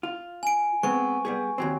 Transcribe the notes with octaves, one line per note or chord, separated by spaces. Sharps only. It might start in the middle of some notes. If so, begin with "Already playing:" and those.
F4
G#5 D7
G#3 B3 C4 C#6
G3 B3 G#4
D#2 F#3 C4